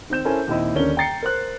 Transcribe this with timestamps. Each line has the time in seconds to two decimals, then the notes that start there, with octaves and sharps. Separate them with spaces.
0.10 D#3 C4 G6 E7
0.25 C#4 E4 A4 A#4 C5 G#5
0.47 D#2 A#2 D#3 C4 E4 D#5
0.75 D#1 D3 C#4 A#4 D5 G7
0.97 G5 A#5 A6 C7 C#7
1.23 A#4 C5 F#6